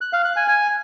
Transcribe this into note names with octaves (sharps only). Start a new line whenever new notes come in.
F#6
F5
F#6
G#5
G#5